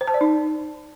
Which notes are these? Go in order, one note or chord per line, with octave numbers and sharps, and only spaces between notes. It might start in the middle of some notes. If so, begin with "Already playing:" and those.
C5
A5
D5
D#4